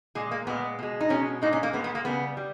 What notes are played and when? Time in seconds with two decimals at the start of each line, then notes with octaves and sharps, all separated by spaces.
0.15 A#2 G#3 G#4
0.31 A#3
0.47 A#2 G#3 B3
0.79 B2 G#3
1.00 D#4
1.10 B2 G#3 C#4
1.42 A#2 G#3 D#4
1.53 C#4
1.63 A#3
1.74 A#2 G#3 B3
1.84 B3
1.95 A#3
2.05 C#3 G3 B3
2.37 G3